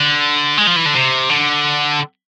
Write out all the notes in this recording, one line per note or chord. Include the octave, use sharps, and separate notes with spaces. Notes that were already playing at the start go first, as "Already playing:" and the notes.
Already playing: D3
G#3
F3
E3
D3
C3
D3